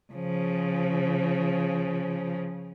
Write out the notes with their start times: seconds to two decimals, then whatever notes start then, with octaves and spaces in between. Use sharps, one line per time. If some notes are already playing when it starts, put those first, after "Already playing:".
0.13 C#3 F3